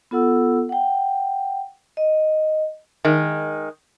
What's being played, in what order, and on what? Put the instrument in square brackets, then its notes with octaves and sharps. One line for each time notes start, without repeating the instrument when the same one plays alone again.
[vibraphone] B3 F4 A4 F#5 E6
F#5 G5
D#5
[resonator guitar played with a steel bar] D#3 G#3